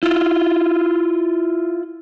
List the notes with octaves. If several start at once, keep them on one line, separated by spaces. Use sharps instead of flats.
E4 F4